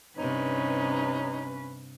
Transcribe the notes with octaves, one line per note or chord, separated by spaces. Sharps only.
G2 C3 C#4 D#4 B4 C#5